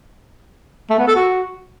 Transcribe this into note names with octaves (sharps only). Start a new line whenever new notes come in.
A3
B3
A4
F#4